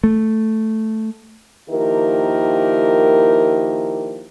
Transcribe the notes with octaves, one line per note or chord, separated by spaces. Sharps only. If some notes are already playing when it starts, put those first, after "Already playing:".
A3
D#3 F3 A#3 E4 G4 A#4